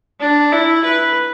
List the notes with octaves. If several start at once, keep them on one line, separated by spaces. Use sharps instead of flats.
D4
E4
B4